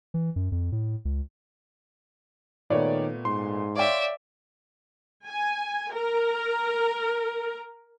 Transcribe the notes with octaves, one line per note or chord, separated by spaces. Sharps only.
E3
F#2
F2
A2
C#2
A#2 D#3 A3 B3 C#5 D5
G#2 C6
C#5 D5 E5 F5 G5
G#5
A#4